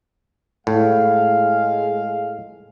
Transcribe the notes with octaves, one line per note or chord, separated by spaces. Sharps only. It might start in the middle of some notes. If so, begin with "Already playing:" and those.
A2 G#3 F5